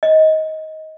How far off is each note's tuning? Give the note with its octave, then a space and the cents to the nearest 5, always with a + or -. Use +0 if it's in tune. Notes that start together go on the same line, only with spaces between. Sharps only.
D#5 +20